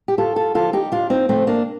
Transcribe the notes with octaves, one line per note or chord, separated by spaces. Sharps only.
G4
D2 F4 A4
F4 A4
D3 F3 F4 A4
D#4 G4
D2 D4 F4
C4 D#4
D3 F3 A3 C4
A#3 D4